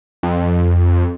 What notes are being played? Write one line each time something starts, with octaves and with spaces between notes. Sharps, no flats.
F2